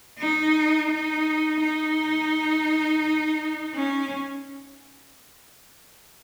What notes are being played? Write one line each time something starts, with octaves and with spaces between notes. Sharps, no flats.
D#4
D#4
D#4
C#4